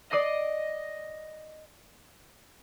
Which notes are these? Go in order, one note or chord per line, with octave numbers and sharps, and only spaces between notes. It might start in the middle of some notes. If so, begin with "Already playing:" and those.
D5 D#5 D#6 C7